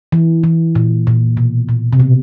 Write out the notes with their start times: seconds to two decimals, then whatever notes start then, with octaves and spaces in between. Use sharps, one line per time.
0.12 E3
0.44 E3
0.75 A#2
1.07 A#2
1.37 B2
1.69 A#2
1.93 C3
2.00 B2